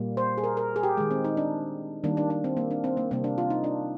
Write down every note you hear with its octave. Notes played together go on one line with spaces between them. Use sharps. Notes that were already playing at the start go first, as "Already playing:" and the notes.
Already playing: A#2 G3 A#3
C5
G#4
A#4
A#4
G#4
G4
D#3 G#3
C4
D#4
D4
D#3 G3 A#3 D4
D4
D4
C4
A#3
D4
C4
A#3
C3 G3 A#3 C4
D4
F4
D#4
D4